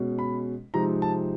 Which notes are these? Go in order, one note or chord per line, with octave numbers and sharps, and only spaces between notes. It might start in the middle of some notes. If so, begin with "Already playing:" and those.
Already playing: B2 G#3 C#4
B5
C3 F3 G#3 C4 D#4 A#5
A5